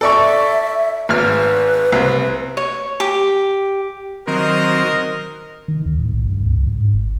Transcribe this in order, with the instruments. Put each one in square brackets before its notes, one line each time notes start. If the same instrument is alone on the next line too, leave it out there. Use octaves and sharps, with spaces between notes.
[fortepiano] A4 D5 C#6 [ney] E5
[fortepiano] G#1 F6 [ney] B4
[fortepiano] C2
[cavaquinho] C#5
G4
[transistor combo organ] D#3 F#3 C4 [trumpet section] A#4 D#5
[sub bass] D#3
D#2
A2
B1
G2
C#2
G#2
G1